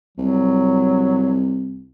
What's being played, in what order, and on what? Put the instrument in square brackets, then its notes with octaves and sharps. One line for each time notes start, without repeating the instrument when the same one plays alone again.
[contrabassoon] C2 [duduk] F#3